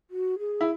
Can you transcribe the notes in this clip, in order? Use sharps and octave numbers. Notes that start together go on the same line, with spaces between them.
F#4
G#4
E4